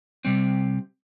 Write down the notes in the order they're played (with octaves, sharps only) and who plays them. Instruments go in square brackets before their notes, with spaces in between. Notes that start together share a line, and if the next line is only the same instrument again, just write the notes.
[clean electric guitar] C3 G3 C4